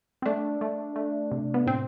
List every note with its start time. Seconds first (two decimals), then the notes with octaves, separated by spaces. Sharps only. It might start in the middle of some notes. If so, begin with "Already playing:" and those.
0.22 C4
0.26 A3 D4
0.61 A3
0.96 A3
1.32 C3
1.54 B3
1.67 A2 C4